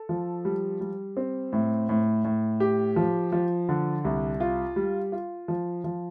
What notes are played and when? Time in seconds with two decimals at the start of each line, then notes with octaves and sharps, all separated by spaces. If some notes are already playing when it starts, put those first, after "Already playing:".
Already playing: A4
0.09 F3
0.45 G3
0.81 G3
1.17 C4
1.53 A2
1.89 A2
2.24 A2
2.60 G4
2.96 F3
3.32 F3
3.69 D3
4.04 C2
4.40 F4
4.76 G3
5.12 F4
5.48 F3
5.84 F3